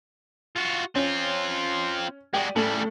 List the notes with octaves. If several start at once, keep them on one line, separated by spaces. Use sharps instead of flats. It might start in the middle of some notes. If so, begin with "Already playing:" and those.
F4 F#4
C4 C#4 F4
G#3 F#4 G4 D5
A2 C#3 G3 A4 F#7